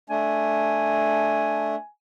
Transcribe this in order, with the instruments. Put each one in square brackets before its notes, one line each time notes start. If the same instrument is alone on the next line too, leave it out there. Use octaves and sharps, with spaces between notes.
[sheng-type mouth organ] A3 D4 [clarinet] G#5